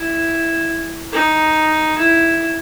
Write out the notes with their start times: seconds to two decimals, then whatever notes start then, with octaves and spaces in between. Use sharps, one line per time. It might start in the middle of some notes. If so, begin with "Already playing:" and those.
Already playing: E4
1.13 D#4
1.98 E4